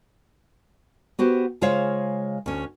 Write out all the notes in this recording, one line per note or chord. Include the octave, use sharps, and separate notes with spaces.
B3 F#4 G4 C5
C#3 G#3 F4 C5 C#5 F5
D2 C#4